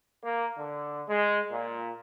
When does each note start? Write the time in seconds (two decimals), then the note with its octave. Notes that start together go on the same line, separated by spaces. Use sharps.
0.23 A#3
0.57 D3
1.08 G#3
1.51 A#2